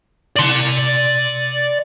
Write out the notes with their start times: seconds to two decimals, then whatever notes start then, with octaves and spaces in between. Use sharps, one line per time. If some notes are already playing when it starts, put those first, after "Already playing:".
0.36 D5 C6